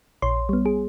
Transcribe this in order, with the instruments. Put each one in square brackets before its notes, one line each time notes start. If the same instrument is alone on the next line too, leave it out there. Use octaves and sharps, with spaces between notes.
[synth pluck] A#1 C#5 C6
G3 B3
G#4